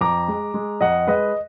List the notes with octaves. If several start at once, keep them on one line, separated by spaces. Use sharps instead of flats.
F2 A#5 D6
G#3
G#3
F2 D#5 F#5
G#3 B4 D#5